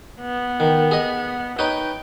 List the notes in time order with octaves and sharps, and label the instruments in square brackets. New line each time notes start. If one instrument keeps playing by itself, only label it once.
[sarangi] B3
[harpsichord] D#3
G#4 D#5
[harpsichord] D#4 B4 C#5 [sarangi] G5